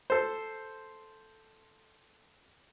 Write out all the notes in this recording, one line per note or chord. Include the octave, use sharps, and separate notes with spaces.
A4 C5